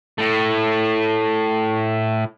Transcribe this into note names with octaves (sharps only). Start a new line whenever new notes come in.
A2 A3